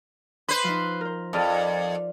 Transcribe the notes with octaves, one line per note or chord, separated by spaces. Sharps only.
B4 C5
F3 D#4
A#4 C5
F2 G#4 D5 F5